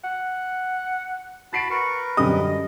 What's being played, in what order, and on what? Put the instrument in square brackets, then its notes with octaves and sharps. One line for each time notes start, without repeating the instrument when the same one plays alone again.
[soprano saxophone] F#5
[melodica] F#4 A5 B5 [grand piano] A6 C7 D7
[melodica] A#4 B4 [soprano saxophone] C#6
[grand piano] F#2 D3 G3 [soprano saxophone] D#5 [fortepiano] D#6